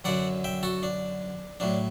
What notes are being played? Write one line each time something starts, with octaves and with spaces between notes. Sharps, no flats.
F#2 D3 F#3 D5 F#5
E5 G5
F#4 A4
D4
A2 F#3 D4